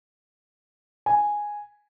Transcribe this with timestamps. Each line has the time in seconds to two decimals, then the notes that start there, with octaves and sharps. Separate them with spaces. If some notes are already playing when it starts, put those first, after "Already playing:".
1.06 G#5